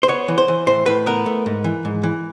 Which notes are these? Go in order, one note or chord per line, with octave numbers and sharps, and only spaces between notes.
C5
B3 C#5
E3
C5
E3
A2 C5
A2 B4
B3 A#4
A3
G#2
E3
G#2
E3